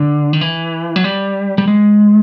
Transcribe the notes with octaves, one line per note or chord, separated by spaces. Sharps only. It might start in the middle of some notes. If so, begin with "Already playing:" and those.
Already playing: D3
D#3
E3
F#3
G3
G3
G#3